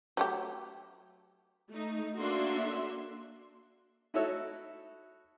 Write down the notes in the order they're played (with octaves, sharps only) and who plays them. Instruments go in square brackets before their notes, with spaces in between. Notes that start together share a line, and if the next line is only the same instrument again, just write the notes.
[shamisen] F#3 A3 G4
[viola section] A3 D#4
A#3 D4 F#4 A4 E5 C6
[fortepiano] D#4 E4 F#4 A4 C#5 E5